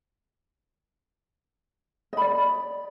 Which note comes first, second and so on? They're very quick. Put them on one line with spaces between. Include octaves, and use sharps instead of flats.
D#5 B5 D5